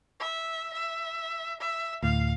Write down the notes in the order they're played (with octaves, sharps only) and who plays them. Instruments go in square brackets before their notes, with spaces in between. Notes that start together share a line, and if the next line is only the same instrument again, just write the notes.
[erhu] E5
E5
E5
[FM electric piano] D2 A2 [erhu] F5